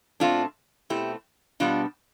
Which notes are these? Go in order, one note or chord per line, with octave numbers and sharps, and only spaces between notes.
B2 A3 C4 D4 F4
B2 A3 C4 E4 G4
B2 G3 B3 D4 F4